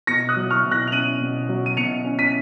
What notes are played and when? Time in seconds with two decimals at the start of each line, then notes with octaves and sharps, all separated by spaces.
0.07 B2 A#6 C#7
0.29 D#6 F#6
0.36 F#3
0.50 C#6 F6
0.64 B2
0.71 F#6 A#6
0.87 F7
0.92 C#4 D#7 F#7
1.20 B2
1.49 F#3
1.66 D#7
1.77 B2 C#7 F7
2.05 C#4
2.19 B6 D#7